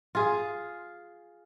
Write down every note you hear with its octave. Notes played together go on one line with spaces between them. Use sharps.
F4 G#4